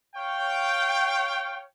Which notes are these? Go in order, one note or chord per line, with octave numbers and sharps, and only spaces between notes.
C#5 F5 G5